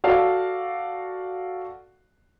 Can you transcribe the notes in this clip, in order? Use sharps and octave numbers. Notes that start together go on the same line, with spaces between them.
F#4 A4 D5 F5